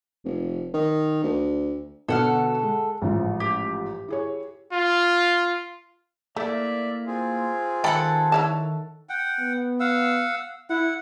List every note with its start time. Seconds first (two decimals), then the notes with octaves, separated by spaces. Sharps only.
0.25 F1
0.74 D#3
1.24 D2
2.09 B2 D3 B3 A4 F#5 F6
2.63 G#3
3.02 A1 G#2 F3
3.40 G4
4.08 E4 G#4 C#5
4.73 F4
6.36 A3 A#3 E4 D5 E5
7.07 C4 F4 G#4
7.84 D#3 A4 F#5 G5 B5
8.32 E4 C#5 A5
9.09 F#5 G5
9.40 B3
9.80 F5 F#5 E6
10.70 E4 F#5